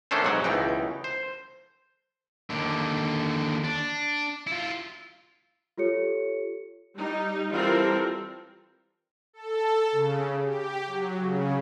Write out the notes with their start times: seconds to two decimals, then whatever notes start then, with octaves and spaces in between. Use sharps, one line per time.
0.11 D#3 A3 C#4 D4 A4 C5
0.24 B1 G#2 C3 F#3 F#5
0.44 C#2 B2 E3 D#4 G5
1.04 C5
2.50 D#2 D3
3.64 D4
4.47 E4 F4
5.78 F4 G4 A4 C#5 C#7
6.97 G3 D#4
7.51 E3 G3 C4 F4 A4 A#4
9.33 A4
9.92 C#3
10.42 G4
10.87 F#3
11.18 C#3